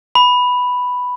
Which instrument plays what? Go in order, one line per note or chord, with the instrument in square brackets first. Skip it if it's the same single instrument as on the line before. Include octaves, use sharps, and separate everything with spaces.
[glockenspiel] B5